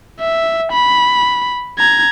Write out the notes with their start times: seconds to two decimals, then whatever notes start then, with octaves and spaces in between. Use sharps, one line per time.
0.20 E5
0.72 B5
1.79 A#5 G#6